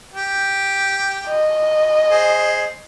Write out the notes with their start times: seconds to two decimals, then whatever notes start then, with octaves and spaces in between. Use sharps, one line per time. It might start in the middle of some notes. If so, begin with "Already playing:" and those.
0.14 G4
1.27 D#5
2.09 G#4 C5